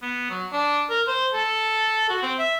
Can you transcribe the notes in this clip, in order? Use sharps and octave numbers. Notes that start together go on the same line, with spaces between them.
B3
F#3
D4
A#4
C5
A4
F#4
C4
E5